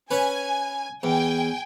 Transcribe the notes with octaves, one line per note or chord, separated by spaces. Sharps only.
C#4 B4 G#5
E2 G5 G#5